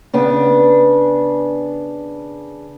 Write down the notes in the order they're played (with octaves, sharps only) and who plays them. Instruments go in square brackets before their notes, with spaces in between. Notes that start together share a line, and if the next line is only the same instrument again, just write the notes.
[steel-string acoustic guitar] C#3 B3 D4